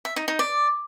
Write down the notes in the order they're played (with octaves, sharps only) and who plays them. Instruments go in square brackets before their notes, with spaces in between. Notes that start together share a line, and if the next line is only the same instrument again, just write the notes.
[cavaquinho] E5
D#4
D#4
D5